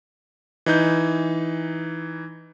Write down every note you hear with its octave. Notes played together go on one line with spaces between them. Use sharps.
E3 D#4 G6